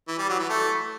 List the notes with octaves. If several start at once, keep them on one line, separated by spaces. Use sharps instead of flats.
E3
G3
F#3
E3
A3